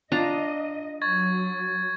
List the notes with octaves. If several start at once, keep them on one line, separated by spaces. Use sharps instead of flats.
D4 F4 D#5 A#5
F#3 C#6 G#6 A6